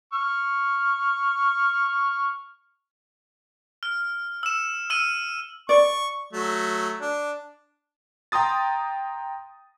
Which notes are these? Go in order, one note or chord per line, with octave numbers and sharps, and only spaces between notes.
C#6 F6
F6
E6 E7
E6 F6 D#7
D5 C#6
F#3 A3
D4
G5 A#5 C6 D#6 A6